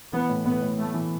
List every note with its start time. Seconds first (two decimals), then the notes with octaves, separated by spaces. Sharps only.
0.13 E3 B3
0.29 A2
0.45 A2 B3
0.62 A2
0.78 A3 B3
0.94 E3